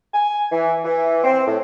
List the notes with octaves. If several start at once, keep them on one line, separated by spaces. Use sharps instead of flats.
G#5
E3
E3
C4
A2